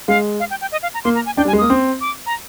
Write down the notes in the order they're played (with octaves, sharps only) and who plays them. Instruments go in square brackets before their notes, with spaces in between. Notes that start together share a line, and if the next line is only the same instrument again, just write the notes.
[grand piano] G#3 [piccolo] F5
[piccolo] F5
G5
G5
D#5
F5
A#5
[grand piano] A#3 [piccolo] C6
[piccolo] A#5
G#5
[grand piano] D4 [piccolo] G5
[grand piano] G3 [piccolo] G#5
[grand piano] G#3
[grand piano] A#3 [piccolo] D#6
[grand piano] C4
[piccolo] D6
A#5